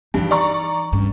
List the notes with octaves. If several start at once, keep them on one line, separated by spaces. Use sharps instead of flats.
G2 E3 D#4
D5 A#5 C#6
G2 C#4